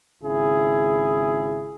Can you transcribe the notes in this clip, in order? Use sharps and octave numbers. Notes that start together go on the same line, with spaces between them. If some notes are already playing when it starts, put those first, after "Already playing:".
G#1 C#3 E4 G#4